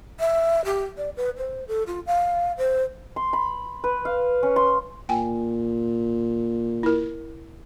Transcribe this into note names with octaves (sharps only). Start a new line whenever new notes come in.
E5
G4
D5
B4
C5
A4
F4
F5
C5
C6
B5
B4
F5
C#4
C6
A#2 G5 G#5
E4 A#4